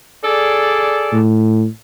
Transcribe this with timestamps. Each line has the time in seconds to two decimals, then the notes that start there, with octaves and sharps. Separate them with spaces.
0.23 G#4 A4 D5
1.12 A2